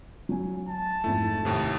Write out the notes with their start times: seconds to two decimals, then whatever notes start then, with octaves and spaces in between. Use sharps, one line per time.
0.29 F#3 G#5
0.68 A5
1.04 F2 G#2 A3 E4
1.45 D#2 A2 C3